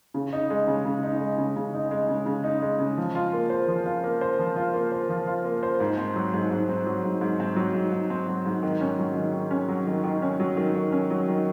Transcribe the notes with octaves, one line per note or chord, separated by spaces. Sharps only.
C#3
D#4
G#3
C#3
C#3
D#4
G#3
C#3
C#3
D#4
G#3
C#3
C#3
D#4
G#3
C#3
F3
F4
A#3
C5
F3
F4
A#3
C5
F3
F4
A#3
C5
F3
F4
A#3
C5
G#2
C4
F#3
G#2
G#2
C4
F#3
G#2
G#2
C4
F#3
G#2
G#2
C4
F#3
G#2
D#3
C#4
F#3
D#3
D#3
C#4
F#3
D#3
D#3
C#4
F#3
D#3
D#3
C#4
F#3
D#3